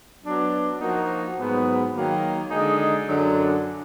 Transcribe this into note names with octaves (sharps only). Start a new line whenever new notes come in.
F#3 B3 D4
F3 A#3 D#4 F#4
G#2 F#3 B3
D#3 F#3 A#3
D3 G#3 D#4 G#4 D#5
F#2 D3 F#3 D4